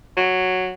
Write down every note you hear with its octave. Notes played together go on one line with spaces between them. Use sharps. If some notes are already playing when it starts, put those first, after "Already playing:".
F#3